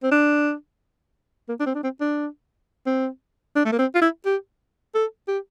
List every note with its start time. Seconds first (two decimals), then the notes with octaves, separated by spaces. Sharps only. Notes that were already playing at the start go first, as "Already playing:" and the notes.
0.03 C4
0.11 D4
1.49 A#3
1.60 D4
1.66 C4
1.75 D4
1.83 C4
2.01 D4
2.87 C4
3.56 D4
3.65 A3
3.72 A#3
3.79 C4
3.95 F4
4.01 E4
4.26 G4
4.94 A4
5.28 G4